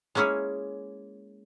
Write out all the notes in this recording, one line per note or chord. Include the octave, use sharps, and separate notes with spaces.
G#3 A#3 C#4 E4 G#4 C#5